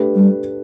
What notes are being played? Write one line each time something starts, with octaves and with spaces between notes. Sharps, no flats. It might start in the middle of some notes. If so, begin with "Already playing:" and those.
Already playing: A3 D4 G4 B4
G3